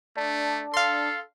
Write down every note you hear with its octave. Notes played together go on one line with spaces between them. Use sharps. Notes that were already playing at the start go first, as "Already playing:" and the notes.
A3 D4
A4 F5 C6